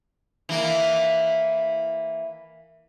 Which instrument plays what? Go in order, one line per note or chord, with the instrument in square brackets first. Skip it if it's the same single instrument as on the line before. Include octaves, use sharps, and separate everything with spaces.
[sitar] E3 A#3